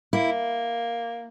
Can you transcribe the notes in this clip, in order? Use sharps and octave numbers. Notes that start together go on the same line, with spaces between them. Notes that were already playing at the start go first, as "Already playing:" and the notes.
A#3 E4